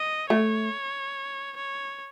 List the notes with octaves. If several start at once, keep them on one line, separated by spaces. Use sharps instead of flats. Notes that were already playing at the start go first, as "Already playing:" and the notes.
Already playing: D#5
A3 C#5
C#5